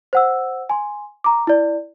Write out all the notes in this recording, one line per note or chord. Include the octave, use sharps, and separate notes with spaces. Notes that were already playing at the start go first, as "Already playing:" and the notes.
C5 F#5 E6
G#5 C6
A#5 D6
E4 D5